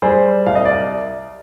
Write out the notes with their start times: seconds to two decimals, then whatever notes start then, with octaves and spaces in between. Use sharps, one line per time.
0.02 G3 G#4 C5
0.46 C2 F5
0.55 D#5
0.65 D5